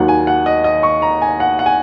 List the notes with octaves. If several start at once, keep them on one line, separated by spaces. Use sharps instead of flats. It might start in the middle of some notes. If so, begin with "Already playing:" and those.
Already playing: D#2 D#3 F#3 F#5
G#5
F#5
D#5
D#5
C#6
A#5
G#5
F#5
F#5
G#5